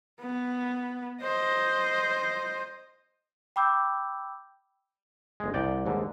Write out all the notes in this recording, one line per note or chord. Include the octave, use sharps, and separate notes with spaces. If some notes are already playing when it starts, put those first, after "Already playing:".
B3
C5 D#5
G5 B5 D6 E6 G6
G1 G#3
C2 D5 G5
D#2 G#2 D3